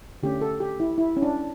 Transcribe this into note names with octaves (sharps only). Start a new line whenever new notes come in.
D3 A3 C#4 G4
A4
G4
E4
E4
C#4
D4